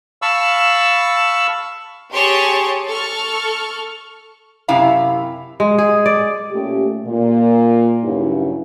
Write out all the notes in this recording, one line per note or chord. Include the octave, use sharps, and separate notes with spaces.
F5 A5 B5 C#6 E6
G4 G#4 C#5 A5 C6
A4 C#6 F6
F#2 C3 E4 F5 A#5
G#3
G#4
D5
A#2 A3 C#4 G4
A#2
G2 C#3 F#3 D#4 E4